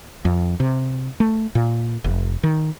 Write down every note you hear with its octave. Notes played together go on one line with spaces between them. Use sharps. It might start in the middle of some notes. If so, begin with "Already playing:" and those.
F2
C3
A3
A#2
F1
D#3